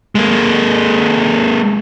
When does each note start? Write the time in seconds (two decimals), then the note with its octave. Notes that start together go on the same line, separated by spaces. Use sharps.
0.15 G#3 A#3